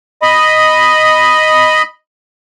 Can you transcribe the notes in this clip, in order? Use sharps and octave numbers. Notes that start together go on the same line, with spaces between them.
D#5 B5